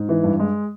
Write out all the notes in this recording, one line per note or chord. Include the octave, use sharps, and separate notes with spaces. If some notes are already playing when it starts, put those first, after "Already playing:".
Already playing: G#2
E3
G2
G#3